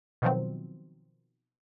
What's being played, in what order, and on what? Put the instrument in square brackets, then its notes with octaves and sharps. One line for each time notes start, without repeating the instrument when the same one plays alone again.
[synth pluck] B2 D#3 F3 F#3 C4